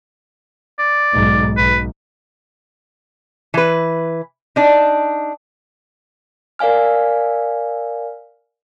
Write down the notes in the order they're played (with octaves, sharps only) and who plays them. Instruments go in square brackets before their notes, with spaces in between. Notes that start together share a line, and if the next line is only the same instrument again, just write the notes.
[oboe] D5
[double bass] B1 G#2
[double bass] B1 [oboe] B4
[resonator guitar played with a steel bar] E3 B4
D4 D#4
[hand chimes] A#4 D5 F5 G#5 F6